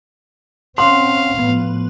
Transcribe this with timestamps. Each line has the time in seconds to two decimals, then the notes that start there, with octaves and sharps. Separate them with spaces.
0.78 C4 C#4 F5 F#5 C6
1.39 A2 F3 B3